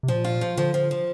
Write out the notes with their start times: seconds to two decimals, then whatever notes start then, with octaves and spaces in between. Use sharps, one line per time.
0.03 C3
0.08 A#2 F3
0.25 F4
0.41 F3
0.57 D3 F3
0.74 F3
0.91 F3